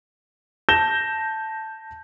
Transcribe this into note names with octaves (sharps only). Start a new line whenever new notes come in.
A5 G6 A#6 E7 G7